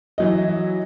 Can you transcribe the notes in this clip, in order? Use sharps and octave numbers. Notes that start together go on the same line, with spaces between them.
E3 F#3 D#5